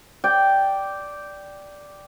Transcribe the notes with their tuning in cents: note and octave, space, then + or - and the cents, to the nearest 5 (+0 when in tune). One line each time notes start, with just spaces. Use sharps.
D5 -5 G5 -5